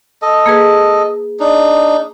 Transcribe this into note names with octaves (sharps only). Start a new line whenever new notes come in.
A4 D#5
A#3 G#4 B4
D4 D#4